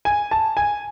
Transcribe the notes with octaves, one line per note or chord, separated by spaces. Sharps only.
G#5
A5
G#5